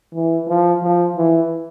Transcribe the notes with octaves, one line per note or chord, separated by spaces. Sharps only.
E3
F3
F3
E3